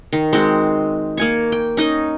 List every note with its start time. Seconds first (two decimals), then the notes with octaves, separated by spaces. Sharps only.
0.13 D#3
0.33 G#3 C4 F#4
1.17 A#3 G#5 C#6
1.52 G5
1.77 C#4 D#4 D#5